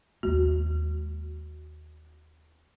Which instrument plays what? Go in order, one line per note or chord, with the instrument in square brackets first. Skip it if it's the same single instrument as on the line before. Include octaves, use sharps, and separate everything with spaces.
[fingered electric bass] D#2 G#3 A#3 [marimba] F#4